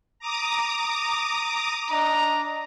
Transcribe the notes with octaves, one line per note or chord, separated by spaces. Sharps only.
A#5 D6 D#6
D4 D#5 A#5